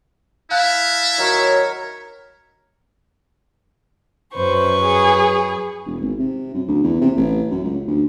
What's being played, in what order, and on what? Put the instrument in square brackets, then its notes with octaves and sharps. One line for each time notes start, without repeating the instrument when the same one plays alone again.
[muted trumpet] E4 [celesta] F5 F#6 [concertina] A5 F6
[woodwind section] D#3 F#3 C#5 [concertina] A#4
[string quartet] F#2 B4 C#6 [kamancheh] C5
[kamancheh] G#4
[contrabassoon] E1
G#1
C3
F#2
D2
E2
C3
A1
F#2
C#2
D2